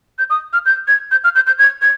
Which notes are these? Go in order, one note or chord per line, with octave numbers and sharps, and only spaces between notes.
G6
D#6
F6
G6
G#6
G6
F6
G6
G6
G#6
G#6